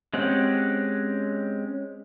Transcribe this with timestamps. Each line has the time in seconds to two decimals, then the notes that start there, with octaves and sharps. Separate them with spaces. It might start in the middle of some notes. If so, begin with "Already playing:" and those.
0.14 G#3 C4 C#4 G4 F#5